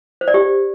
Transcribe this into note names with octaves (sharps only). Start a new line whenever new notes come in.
C5
D5
G4